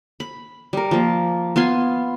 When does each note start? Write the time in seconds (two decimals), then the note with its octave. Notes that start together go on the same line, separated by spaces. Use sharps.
0.20 B5
0.73 G3 A#4
0.91 F3 A#3
1.56 B3 F4 G#5 C6